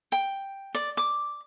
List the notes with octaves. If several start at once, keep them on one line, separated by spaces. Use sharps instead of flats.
G5
D5
D6